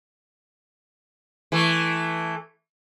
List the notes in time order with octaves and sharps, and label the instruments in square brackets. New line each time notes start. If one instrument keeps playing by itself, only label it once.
[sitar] E3 A3